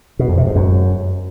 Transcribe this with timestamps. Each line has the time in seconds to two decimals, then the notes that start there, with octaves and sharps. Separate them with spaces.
0.19 B2
0.28 F2
0.38 C3
0.47 G#2
0.56 F#2